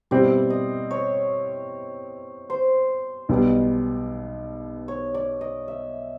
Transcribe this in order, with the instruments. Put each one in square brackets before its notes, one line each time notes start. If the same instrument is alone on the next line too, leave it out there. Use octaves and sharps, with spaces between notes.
[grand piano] B2 G3 C4 E4 G4 [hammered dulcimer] D5
[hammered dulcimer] D#5
C#5
C5
[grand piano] B1 B2 G3 B3
[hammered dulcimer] C#5
D5
D#5
E5